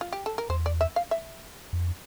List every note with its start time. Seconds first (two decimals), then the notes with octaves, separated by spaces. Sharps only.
0.01 F4
0.12 G4
0.26 A4
0.38 A#4
0.50 E2 C5
0.66 D5
0.81 E5
0.96 F5
1.11 E5
1.73 F2